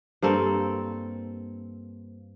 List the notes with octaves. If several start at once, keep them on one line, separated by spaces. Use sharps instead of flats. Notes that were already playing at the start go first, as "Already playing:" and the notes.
G2 A#3 C4 A4